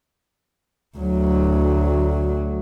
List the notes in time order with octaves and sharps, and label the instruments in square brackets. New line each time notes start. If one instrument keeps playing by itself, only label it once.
[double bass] D2 F#3